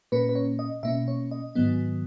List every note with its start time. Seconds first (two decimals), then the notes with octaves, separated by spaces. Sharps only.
0.12 A#2 A#3 C#4 B4
0.29 B4
0.35 C#5
0.59 D#5
0.83 B2 A#3 C#4 E5
1.08 C#5
1.31 D#5
1.55 G#2 D#3 F#3 B3